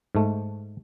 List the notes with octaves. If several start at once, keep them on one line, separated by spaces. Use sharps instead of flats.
G#2 A3